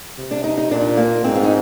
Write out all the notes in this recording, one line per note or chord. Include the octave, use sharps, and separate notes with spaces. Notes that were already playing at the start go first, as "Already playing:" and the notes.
C3
D4
D#4
D#4
A#2 D4
A#3
G#2 C4
F4
D#4